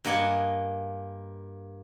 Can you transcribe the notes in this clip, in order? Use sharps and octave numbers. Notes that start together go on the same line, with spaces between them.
G2 A#3 D#5 F#5 G#5 A5